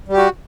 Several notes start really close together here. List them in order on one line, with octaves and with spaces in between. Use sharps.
G3 G4 F#4